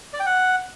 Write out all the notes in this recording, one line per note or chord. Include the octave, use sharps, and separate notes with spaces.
D5
G5
F#5